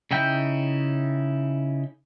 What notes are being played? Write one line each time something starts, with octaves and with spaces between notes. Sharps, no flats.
C#3 D#4 E4 G5 G6